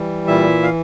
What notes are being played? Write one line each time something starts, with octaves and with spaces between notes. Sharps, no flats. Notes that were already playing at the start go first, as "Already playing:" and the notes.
Already playing: E3 G3
A#2 E4 E5
F5